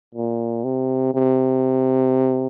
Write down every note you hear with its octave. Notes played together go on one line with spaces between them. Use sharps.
A#2
C3
C3